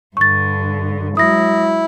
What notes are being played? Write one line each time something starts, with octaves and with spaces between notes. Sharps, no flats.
G2 D3 C#6 A6
F#3 G#3 E4 D#6 A#6